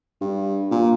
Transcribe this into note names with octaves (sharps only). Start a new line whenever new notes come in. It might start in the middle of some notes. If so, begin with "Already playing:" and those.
G2
A#2